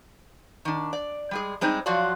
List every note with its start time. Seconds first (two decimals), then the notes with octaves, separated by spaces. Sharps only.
0.65 D#3 D4
0.93 D5
1.31 G3 G#3 G#4
1.61 G3 G#3 C4 D#4
1.86 F3 F#3 F4 F#4 D5